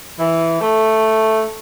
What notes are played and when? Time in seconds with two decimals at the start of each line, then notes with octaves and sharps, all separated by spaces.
0.19 E3
0.61 A3